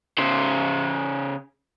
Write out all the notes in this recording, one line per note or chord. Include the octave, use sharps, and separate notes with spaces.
C#3 C5